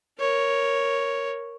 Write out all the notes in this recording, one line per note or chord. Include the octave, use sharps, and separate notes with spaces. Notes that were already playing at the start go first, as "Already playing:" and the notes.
A#4 C#5